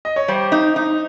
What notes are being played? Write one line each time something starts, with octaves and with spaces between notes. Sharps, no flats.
D#5
C#5
G3 C5
D#4
D#4